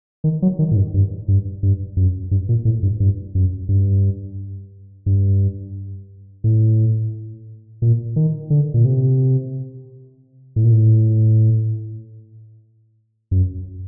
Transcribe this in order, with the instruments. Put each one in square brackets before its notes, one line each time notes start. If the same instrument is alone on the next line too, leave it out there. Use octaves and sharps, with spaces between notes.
[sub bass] D#3
F#3
D#3
A2
G2
G2
G2
G2
F#2
G2
A#2
A2
G2
G2
F#2
G2
G2
A2
A#2
D#3
D3
A#2
C3
A2
A#2
A2
F#2